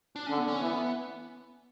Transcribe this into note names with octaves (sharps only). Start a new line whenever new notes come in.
D4
D3 C#4
B3
C#4
E3 B3